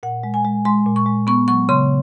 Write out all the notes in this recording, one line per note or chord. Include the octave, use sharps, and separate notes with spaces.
A#2 F#5
G#3
G#5
G#3
G#3 C6
A#2
C#6
G#3
B3 C#6
F#3 C#6
C#3 C6